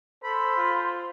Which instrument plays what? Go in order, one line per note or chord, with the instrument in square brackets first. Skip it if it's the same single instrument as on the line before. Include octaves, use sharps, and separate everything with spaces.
[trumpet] A4 [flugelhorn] C5 [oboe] B5
[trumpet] F4